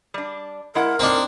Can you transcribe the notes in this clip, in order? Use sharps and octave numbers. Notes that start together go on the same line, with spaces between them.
G3 D4
G#3 E4 A#4 F#5
A2 A#3 C4 D4 D#4